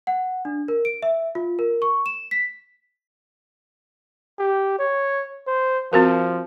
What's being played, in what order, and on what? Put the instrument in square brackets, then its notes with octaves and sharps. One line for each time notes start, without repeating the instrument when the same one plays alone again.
[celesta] F#5
D4
A#4
D7
E5
F4
A#4
C#6
E7
B6
[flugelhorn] G4
C#5
C5
[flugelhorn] F3 [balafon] C4 F#4 A#4